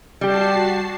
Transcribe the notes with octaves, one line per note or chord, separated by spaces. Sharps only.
G3 F#4 G4 A5 C7